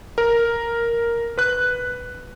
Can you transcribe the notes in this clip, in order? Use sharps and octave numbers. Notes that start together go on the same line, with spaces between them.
A#4
B4 F#6